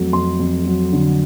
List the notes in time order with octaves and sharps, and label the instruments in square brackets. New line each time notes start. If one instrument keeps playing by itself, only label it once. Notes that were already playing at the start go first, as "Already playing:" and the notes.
Already playing: [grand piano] F2 F#3 A3
F2 C6
F2
F#3
D3